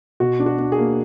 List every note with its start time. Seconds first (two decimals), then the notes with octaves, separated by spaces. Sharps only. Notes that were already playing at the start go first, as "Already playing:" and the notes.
0.20 B2 F#4
0.40 D4
0.46 F#4
0.59 D4
0.72 G#4
0.78 A#3